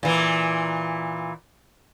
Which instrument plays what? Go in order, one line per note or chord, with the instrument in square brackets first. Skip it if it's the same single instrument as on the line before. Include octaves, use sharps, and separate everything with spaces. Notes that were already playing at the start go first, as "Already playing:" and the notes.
[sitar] A#2 E3